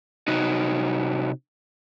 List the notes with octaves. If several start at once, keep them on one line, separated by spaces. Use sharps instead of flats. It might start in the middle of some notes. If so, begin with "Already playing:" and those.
C3 D#4 F#4